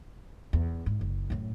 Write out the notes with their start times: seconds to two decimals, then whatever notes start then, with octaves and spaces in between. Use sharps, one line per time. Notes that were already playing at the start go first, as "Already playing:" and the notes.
0.53 E2
0.86 G#2
1.01 F#1
1.30 F#2 A2